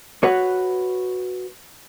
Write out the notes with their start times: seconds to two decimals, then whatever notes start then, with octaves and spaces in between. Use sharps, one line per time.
0.23 F#4 B4 C#5